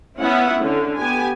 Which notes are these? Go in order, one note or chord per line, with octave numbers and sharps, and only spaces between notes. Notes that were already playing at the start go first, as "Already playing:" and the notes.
B3 C#4 E4 E5 F#5
D3 C#4
B3 G4 G#5